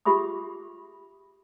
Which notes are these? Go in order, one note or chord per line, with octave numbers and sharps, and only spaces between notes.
F4 G4 G#4 E5 B5 D#6